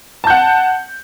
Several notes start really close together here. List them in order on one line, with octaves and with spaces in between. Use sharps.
A5 G6 F#5